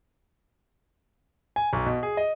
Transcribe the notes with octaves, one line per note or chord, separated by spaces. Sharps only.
G#5
B1
B2
G#4
D#5